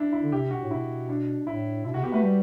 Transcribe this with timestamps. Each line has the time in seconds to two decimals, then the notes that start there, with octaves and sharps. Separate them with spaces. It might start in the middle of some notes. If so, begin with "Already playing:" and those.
Already playing: D4 E4
0.13 E4
0.23 D3
0.32 C3 G4
0.51 B2 F#4
0.62 A2
0.71 B2 E4
1.09 D4
1.46 A2 E4
1.84 B2 E4
1.94 C3 F#4
2.03 B3 G4
2.13 A3 B4
2.23 G3